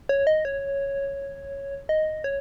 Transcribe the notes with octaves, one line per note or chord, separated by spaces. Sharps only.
C#5
D#5
C#5
D#5
C#5